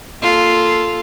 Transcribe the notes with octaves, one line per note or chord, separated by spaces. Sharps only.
A#3 F4 A4